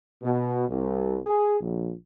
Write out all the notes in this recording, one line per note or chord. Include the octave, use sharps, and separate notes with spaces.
B2
C2
G#4
A#1